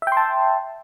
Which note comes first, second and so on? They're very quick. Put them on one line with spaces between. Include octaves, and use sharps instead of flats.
E5 G5 C6 A5